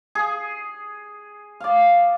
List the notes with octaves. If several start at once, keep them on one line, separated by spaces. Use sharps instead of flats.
G#4
D5 F5